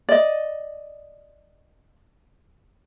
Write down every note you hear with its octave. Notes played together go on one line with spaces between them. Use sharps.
D5 D#5